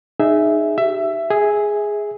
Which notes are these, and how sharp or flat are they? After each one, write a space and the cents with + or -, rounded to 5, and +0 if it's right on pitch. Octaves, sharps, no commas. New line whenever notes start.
D#4 -20 G#4 +0 E5 +0
G4 -35 E5 +15
G#4 +0 E5 -20